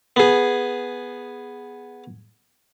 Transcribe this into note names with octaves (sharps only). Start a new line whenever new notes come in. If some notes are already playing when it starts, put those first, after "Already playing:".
B3 G#4